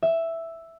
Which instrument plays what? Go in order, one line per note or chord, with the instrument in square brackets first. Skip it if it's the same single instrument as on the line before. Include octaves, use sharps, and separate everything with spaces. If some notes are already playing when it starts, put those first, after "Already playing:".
[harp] E5